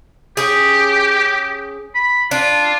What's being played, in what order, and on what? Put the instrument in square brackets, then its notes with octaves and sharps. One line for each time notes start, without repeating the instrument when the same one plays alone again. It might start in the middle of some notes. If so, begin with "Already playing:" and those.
[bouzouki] C#4 G#4 [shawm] G4
[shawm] B5
[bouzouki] D4 [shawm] F4